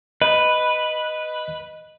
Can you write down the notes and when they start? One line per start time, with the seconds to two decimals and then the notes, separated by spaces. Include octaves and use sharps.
0.21 B4 D#5